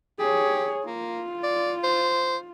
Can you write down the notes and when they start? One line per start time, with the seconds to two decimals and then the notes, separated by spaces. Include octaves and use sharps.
0.20 G4 G#4 C#5
0.87 A#3 F4
1.43 D5
1.84 C5